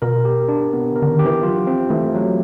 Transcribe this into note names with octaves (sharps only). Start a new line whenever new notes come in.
B2 A#4
G4
D4
C3 B3
D3
A#4
D3
D#3
G4
E3
F#3 F4
F3 C4
E3 A3
F#3